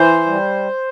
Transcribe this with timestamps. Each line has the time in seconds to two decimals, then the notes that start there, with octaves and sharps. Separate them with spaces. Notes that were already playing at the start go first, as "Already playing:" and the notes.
Already playing: E3 C5
0.26 G3